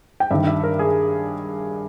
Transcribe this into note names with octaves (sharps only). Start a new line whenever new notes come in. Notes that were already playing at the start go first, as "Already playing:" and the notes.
G5
G2 D#3 E5
E5
A#4
G#4